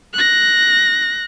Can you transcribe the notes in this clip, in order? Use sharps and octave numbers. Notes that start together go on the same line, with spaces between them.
F#6 A#6